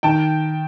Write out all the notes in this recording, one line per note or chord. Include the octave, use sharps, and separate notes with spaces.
D#3 G5 A5